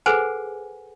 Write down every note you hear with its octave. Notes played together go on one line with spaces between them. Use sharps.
G#4 A4 B4 C5 F#5 G#5